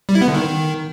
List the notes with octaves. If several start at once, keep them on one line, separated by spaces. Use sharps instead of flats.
G3
E4
B3
D3
D#3